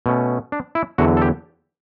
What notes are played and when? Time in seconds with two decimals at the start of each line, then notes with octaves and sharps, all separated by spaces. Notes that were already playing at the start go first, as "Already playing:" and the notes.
0.06 B2 A3 C#4
0.52 D4
0.75 E4
0.98 E2 D3 F#3 F#4
1.17 A4
1.22 G4